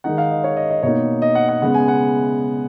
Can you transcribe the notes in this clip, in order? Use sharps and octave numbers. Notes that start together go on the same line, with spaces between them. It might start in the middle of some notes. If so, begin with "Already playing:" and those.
D#3 G#3 D#4 F#5
F5
D#5
C#5
D#5
D#5
B2 A#3 D#4 C#5
D#5
F#5
F#5
C#3 G#3 B3 F#5
G#5
F#5